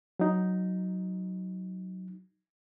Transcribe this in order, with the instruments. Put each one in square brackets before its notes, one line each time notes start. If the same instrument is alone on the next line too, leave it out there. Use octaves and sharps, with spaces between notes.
[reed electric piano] F#3 D#4